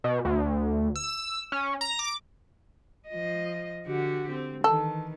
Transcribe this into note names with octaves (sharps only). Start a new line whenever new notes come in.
B2
D2
E6
C#4
A#5
D6
F3 D#5
D3 F#4 G4
C4
D#3 E3 A4